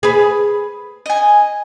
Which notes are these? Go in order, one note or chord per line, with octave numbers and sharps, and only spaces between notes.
G#4 B4
D#5 G#5